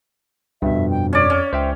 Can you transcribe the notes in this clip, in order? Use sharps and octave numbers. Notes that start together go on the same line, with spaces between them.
C#2 G2 B2 E5
F2
G5
C#4 C#5 D5
C#4
C#2 C5 E5 G5